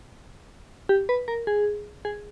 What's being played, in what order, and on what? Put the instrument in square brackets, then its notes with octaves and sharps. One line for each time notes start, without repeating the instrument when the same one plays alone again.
[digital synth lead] G4
B4
A#4
G#4
G#4